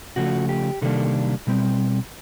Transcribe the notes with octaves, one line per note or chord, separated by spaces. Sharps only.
C#3 F3 A3 F#4
G4
C3 D#3 G3 A#3 D4 A4
B2 G3 C4